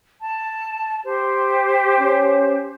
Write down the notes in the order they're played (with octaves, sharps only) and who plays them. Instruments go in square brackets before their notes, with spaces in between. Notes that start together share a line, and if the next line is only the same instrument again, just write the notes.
[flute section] A5
G4 C5
[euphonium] C#4